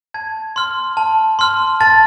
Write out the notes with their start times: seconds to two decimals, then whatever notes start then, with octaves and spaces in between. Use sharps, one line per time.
0.14 A5 G#6
0.56 C6 F6
0.97 A5
1.39 C6 F6
1.81 A5 A6